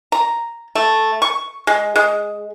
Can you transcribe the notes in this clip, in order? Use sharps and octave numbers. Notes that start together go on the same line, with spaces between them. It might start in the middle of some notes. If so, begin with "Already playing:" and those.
A#5
A3
C#6
G#3
G#3